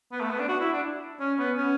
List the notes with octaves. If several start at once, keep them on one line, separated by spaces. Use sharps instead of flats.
B3
A3
B3
D4
F#4
E4
D4
C#4
B3
C#4